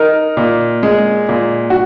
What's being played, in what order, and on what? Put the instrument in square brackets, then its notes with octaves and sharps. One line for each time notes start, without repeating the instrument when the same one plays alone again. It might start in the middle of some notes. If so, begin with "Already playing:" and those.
Already playing: [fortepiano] D#4 [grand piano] A#4
[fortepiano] A#2
G#3
A#2
[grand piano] F#4